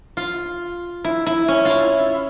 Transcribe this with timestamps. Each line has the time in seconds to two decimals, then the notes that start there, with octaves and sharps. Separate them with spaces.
0.17 F4
1.04 E4
1.26 E4
1.48 C#4
1.65 E4 F4